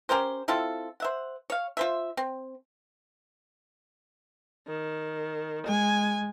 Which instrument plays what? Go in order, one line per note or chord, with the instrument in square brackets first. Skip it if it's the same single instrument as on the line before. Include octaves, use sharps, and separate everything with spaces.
[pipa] C#4 G4 A#4 C5
C4 E4 F4 A4
C5 E5 F#5
C#5 F5
F4 C5 E5
C4
[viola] D#3
[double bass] G#3 [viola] G#5